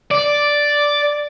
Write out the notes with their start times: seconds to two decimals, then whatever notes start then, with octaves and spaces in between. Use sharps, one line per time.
0.11 D5